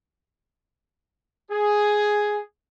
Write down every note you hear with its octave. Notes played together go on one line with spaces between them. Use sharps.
G#4